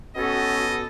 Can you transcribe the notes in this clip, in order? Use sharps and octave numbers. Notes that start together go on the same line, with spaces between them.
B3 C#4 F#4 A4 D#5